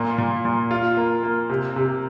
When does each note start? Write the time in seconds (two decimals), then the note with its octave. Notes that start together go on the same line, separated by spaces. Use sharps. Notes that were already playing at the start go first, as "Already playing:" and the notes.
Already playing: A#2 A#3
0.18 A#2
0.45 A#2
0.71 F4
0.97 A#3
1.23 A#3
1.50 C3
1.76 C3